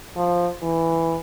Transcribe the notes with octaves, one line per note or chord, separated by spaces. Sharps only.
F3
E3